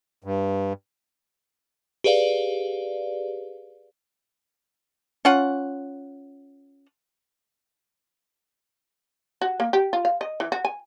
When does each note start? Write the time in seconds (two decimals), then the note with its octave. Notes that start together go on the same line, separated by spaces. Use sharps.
0.24 G2
2.04 G4 G#4 B4 D5 F5
5.25 C#4 F4 F#5
9.42 F#4
9.60 A#3
9.73 G4
9.93 F4
10.05 F5
10.21 D#5
10.40 E3
10.52 F#4
10.65 G#5